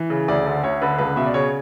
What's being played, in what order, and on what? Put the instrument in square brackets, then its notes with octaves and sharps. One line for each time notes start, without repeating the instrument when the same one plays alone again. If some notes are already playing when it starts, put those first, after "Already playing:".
Already playing: [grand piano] E3
C#3
D2 D5
D3
D2 C#5
D3 B4
C#2 B4
B2 E5
D5
C#3 C#5